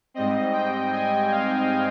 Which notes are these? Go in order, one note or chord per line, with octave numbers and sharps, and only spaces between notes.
G#2 G3 C4 D#5
G5
G#5
F5